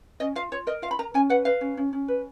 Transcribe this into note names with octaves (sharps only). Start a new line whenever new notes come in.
C#4 D#5
F4 F5
F4 C#5
A#4 D#5
F4 F5
B5
A#4 A#5
C#4 G#5
B4 F#5
B4 F5
C#4
C#4
C#4
B4